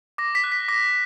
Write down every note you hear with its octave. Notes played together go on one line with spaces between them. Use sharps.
D6 A#6
B6
F#6
B6
D6 A#6